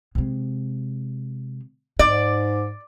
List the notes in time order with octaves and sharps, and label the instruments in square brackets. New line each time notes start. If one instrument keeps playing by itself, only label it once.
[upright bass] C3 G#3
[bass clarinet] G#2 [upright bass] D#4 [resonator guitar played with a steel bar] D5